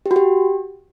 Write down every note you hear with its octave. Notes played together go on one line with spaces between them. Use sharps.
G4
F#4
G4